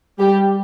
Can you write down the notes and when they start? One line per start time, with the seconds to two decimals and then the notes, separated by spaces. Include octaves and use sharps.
0.19 G3 G4